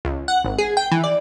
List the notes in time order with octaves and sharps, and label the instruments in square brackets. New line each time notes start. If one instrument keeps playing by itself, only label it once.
[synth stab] C#2
F#5
G#1
G#4
G5
E3
D5